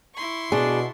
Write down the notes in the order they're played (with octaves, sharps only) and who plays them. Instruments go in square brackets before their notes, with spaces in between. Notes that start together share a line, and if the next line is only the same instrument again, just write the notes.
[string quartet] E4 C6 C#6
[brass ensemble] B2 [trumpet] D4 [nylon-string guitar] G#4